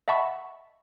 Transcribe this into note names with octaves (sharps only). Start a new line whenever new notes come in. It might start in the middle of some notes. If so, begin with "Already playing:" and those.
D#5 E5 F#5 A5 B5 C#6